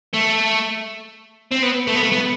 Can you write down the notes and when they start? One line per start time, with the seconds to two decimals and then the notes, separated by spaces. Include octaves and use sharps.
0.13 A3
1.51 C4
1.62 B3
1.87 A3
1.95 B3
2.03 A3
2.12 B3